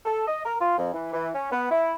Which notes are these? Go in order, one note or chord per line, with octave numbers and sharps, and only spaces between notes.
A4
D#5
A#4
F4
F2
E3
E3
C#4
B3
E4